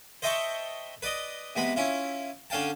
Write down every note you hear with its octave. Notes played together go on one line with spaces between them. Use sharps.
C5 D#5 E5 G5 A5 C#6
B4 D5 D#5
C3 G#3 B3 B5
C#4 E4 F4
D3 C#4 F5 G5 A5